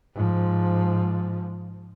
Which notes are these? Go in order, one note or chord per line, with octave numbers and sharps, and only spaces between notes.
G#2 F3